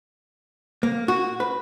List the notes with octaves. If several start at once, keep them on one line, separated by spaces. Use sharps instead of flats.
A#3
F#4
B4